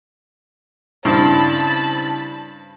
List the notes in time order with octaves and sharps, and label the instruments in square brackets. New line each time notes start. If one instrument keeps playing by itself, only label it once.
[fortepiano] G2 [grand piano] C#3 C4 D4 [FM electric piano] E4 C5 [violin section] A5 B5